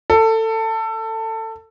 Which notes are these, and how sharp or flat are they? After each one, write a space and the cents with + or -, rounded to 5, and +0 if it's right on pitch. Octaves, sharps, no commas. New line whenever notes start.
A4 +20